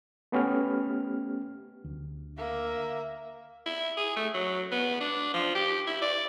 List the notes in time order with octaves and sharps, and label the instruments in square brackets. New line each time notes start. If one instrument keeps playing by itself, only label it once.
[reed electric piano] A3 B3 C#4 G4 F6
[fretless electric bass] D2
[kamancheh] A#3 E5
[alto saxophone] E4
G#4
A3
F#3
B3
D4
F3
G4
E4
D5